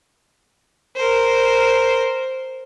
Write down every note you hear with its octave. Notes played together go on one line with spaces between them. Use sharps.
A#4 C5